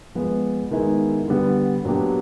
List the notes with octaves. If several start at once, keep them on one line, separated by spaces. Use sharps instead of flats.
F3 G#3 B3
D#3 G#3 B3 E4
D3 G3 B3
A#2 F#3 B3 D4 G4